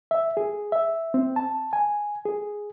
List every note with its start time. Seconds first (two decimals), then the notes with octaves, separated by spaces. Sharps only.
0.11 E5
0.37 G#4
0.72 E5
1.14 C4
1.36 A5
1.73 G#5
2.25 G#4